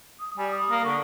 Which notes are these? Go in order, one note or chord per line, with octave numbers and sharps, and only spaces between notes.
D#6
G3 G#5
D#6
A#3
D3 C#6